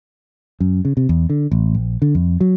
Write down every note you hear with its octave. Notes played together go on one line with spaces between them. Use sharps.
F#2
C#3
C3
E2
D3
A1
A#1
D3
F2
F#3